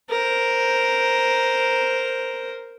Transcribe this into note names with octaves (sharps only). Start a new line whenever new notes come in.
A#4 C5